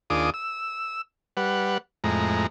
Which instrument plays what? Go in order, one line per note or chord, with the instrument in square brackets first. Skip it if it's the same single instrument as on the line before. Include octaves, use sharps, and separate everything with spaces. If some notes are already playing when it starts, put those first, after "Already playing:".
[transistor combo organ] D#2 D4 F4 G#4 D6 D#6
E6
G3 B4 F#5
F2 A2 G#3 A#5